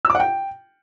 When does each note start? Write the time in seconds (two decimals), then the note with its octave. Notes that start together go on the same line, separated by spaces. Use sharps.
0.05 E6
0.10 D6
0.15 F#5
0.20 G5